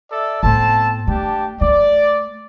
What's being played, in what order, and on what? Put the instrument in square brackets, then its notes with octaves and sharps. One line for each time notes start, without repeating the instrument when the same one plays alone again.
[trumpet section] A4 D5 E5
[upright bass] A2 B3 [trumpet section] C4 A4 A5
[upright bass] A3 [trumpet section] D4 G4 A5
[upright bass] A3 [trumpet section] D5